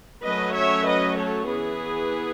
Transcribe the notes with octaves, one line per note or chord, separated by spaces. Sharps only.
F#3 A3 C#4 B4 D#5
C#5 E5
B4 D#5
A4 C#5
E3 B3 G#4 B4